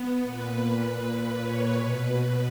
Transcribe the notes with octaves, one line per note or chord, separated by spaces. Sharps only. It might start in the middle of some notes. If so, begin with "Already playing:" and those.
Already playing: B3
A#2 B4
C#5
B2 B4